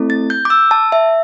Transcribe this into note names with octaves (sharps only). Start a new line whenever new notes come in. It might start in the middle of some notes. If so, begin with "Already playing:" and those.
Already playing: A3 C4 E4 A4
A6
G6
D6
E6
A5
E5